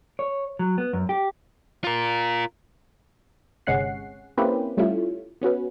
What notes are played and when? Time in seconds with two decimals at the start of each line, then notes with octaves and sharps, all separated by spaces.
0.19 C#5
0.59 F#3
0.78 B3
0.93 F#2
1.09 G4
1.84 F4 A#4
3.67 G1 C3 G#3 C#4 F#5 C7
4.37 A#3 C4 C#4 E4 G4 B4
4.77 G3 A3 C#4 E4 F4
5.41 B3 C#4 F#4 B4